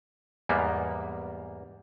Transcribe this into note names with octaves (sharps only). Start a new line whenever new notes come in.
E2 G#2 G3 A#3 B3